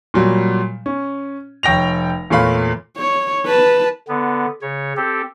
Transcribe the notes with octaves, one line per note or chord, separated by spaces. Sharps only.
A#2 F#3 G3
C#4
F1 C#5 G5 A#6 F7
E2 A#2 A3 C#5 F5 B5
C#5
B4 A5
D3 B3
C#3 C#5
C4 G4 A4